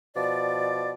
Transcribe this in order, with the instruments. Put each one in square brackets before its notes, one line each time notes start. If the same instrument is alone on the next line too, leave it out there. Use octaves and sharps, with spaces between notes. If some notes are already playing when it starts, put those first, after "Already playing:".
[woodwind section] B2 F3 D5